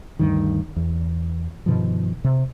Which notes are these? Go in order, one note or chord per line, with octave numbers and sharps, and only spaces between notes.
D2 G2 D#3
E2
G2 B2 D#3 F3
C3